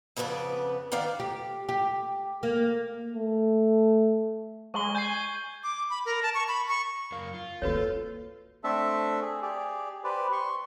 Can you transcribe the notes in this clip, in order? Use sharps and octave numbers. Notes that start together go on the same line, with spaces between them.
F2 C#3 B3 B4 D5
D#3 B3 D5 F5
G4
G4
A#3
A3
G#3 C#6 F#7 G7
G#5 G6 C7
D6
B5
A#4
A5
C#6
B5
C#6
F#2 A#4 F5
F4
A#3 C4 F#4 A4 B4 C#5
A3 C4 D4 A4 E5
G#4
G4 G#4 D5
G4 B4 C5 D5
C6 C#6